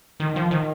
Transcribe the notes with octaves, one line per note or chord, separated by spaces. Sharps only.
D#3
F3
D#3